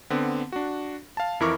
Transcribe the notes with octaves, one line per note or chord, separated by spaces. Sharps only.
D3 B3 C4
D4 F#4
F5 A5
F2 E3 E4 A#4 C#6 D6